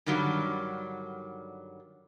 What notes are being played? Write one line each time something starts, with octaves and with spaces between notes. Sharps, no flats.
G2 D3 D#3 F#3 G3